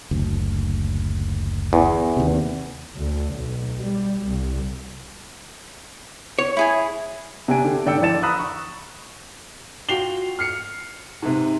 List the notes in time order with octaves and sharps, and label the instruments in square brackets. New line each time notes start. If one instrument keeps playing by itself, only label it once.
[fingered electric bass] F#1 D2
[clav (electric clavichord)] E2
[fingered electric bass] D#2 C3
[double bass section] D2
B1
G3
C2
[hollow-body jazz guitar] C#5
[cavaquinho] E4 G#4 G#5
[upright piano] C3 D4 G#5 D7
D3 G4
G#2 D3 D5 G5 E6 C#7
E3 F3 D5 A6 E7
A#5 B5 D#6 E6 F#6
C#6
F4 F#4 G5 C7 F7 G7
F6 C7 C#7
G#2 C3